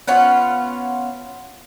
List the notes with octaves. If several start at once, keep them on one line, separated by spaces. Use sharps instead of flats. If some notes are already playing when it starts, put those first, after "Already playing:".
B3 C#4 F4 F#5